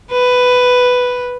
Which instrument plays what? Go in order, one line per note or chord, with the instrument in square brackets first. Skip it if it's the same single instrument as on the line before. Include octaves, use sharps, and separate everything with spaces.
[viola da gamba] B4